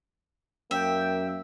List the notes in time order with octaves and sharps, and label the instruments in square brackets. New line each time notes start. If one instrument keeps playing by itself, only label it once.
[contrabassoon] F#2 [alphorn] A#3 [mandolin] E5 [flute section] G5